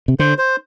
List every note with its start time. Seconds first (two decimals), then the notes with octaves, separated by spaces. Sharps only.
0.08 C3
0.19 D3 C5
0.38 C5